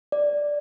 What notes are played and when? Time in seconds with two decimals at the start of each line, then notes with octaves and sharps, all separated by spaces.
0.12 D5